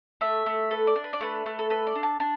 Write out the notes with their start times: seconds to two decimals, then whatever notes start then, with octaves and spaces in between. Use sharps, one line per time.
0.21 A3 E5
0.46 A3
0.71 A4 B4
0.87 D5
0.96 D4
1.04 B4
1.13 D5
1.21 A3 B4
1.46 A3
1.59 A4
1.70 A4 B4
1.87 D5
1.95 D4
2.03 A5
2.20 D4 A5